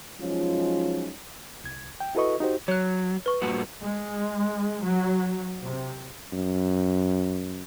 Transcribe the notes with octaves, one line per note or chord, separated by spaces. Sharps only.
F3 F#3 G#3 C#4 D#4 F4
C2 G#6
G5
E4 F#4 A4 B4 D#5 C#6
D#4 F#4 G4 C5
F#3 C#5 F#6
B4 C#6
G2 A#2 F#4
G#3
F#3
C3
F#2